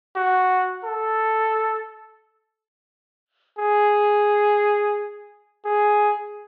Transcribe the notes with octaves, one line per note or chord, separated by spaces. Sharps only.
F#4
A4
G#4
G#4